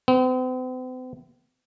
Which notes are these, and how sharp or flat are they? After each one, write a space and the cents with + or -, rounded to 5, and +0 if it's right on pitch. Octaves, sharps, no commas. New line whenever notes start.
C4 -45